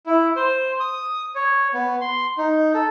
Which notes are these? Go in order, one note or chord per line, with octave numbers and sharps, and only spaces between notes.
E4
C5
D#6
C#5
B3
C6
D#4
A4